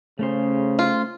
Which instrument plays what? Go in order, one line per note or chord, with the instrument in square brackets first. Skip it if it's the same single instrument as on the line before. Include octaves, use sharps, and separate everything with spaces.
[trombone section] C#3 [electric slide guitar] A3 C#4 C5
[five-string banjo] F4